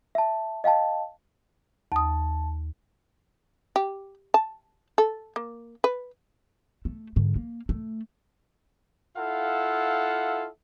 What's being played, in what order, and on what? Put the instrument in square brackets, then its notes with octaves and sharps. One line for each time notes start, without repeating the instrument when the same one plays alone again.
[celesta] E5 A5
D#5 F5 G5 A5
[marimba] D#2 D#6 [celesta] A5
[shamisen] G4
A5
A4
A#3
B4
[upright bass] A3
G#2 D3
A#3
A3
[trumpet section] E4 F4 A4 F5 F#5